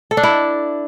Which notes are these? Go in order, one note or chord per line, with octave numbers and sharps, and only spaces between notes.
A4
D4
E4